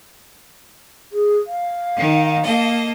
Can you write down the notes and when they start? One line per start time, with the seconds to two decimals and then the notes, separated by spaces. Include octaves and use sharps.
1.12 G#4
1.47 F5
1.96 D#3 D#4
2.42 A#3 A4 D#5